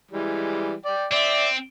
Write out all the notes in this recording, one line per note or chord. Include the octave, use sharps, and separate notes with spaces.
E3 G3 G#3
D5 G5
C4 D5 E5